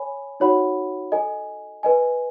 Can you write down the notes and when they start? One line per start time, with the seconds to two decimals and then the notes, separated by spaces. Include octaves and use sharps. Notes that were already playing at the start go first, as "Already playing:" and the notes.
Already playing: C#5 G#5 B5
0.40 D#4 F#4 C#5 F#5 B5
1.12 A4 D#5 G#5
1.83 B4 D#5 G#5